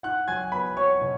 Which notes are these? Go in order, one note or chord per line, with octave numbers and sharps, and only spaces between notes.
D#4 F#5 F#6
F#3 G#5 G#6
B3 B4 B5
F#3 C#5 C#6
B2